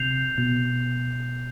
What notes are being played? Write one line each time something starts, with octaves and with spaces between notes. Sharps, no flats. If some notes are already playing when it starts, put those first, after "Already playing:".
Already playing: C3 G6 C7 F7
B2